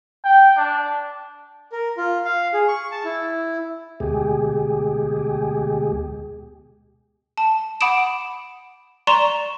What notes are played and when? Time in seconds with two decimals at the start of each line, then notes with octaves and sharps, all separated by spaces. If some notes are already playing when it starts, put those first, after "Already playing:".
0.25 G5
0.57 D4
1.72 A#4
1.97 F4
2.25 F5
2.54 G#4
2.68 C#6
2.92 A5
3.05 E4
4.00 D2 B2 G#3 G4 G#4
7.38 A5
7.81 F#5 B5 D6 D#6 D7 E7
9.07 D5 A#5 C6 C#6 E7